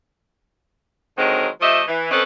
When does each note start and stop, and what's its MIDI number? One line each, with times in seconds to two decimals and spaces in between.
1.18 1.48 50
1.18 1.48 51
1.18 1.48 54
1.18 1.48 56
1.18 1.48 60
1.18 1.48 70
1.61 1.82 53
1.61 1.82 57
1.61 1.82 67
1.61 1.82 75
1.61 1.82 76
1.88 2.07 52
2.11 2.23 60
2.11 2.23 61
2.11 2.23 69
2.11 2.23 71
2.11 2.23 72
2.11 2.23 75